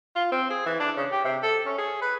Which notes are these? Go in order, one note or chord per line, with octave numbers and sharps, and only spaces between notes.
F4
C4
G#4
E3
D4
C#3
G4
C3
A4
C#4
G#4
B4